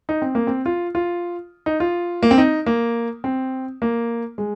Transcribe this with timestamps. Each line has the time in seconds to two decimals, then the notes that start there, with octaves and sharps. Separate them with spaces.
0.09 D#4
0.22 C4
0.35 A#3
0.47 C4
0.66 F4
0.95 F4
1.66 D#4
1.80 F4
2.23 A#3
2.31 C4
2.38 D#4
2.66 A#3
3.24 C4
3.82 A#3
4.38 G#3